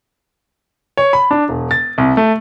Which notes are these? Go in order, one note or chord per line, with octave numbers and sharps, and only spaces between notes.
C#5
B5
D4
E1
A6
C2
A3